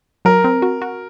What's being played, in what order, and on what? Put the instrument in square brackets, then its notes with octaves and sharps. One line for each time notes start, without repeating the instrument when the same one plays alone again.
[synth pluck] F#3 [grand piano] A#4
[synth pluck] C4
F#4
F#4